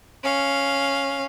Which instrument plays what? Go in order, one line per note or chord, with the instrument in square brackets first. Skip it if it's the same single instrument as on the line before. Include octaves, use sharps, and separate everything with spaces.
[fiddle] C#4 F5